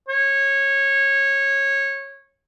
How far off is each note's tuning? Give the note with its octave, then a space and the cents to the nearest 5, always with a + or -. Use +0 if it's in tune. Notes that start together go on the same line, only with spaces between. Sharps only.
C#5 -15